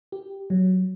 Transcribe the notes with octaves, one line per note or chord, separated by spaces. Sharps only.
G4
F#3